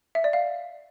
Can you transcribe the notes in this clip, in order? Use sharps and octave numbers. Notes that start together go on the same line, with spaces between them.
E5
D5
F5